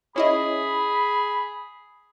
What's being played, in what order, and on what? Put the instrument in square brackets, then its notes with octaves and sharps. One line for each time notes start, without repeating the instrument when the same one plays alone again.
[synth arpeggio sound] C#4 E4 D#5 [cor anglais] G#4 [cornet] B5